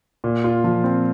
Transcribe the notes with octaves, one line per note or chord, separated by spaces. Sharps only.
A#2
F4
F3
C4